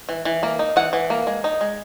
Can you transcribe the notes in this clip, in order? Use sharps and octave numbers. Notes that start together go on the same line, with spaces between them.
E3
E3
A#3
D#4
E3 F#5
E3
A#3
G#3
D#4
G#3